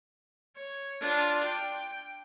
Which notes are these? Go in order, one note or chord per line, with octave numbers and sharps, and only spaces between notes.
C#5
D4 F4
G5